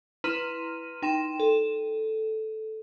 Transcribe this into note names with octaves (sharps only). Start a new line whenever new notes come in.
E4 B4 A#5 C6 F6 D#7
D#4 G5 C6 E7
A4